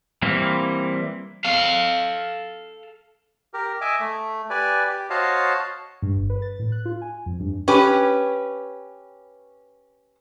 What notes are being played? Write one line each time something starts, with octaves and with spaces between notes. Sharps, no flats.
E3 G3 A#3 C4 E4
A4 F5
G4 A#4
D#5 E5 G#5 D6
A3
G4 B4 D5 G#5
G4
F#4 C5 C#5 D#5 F5 A5
G2
G1
B4
A6
A2
F#6
F4
G#5
F2
G2
C#4 G4 B4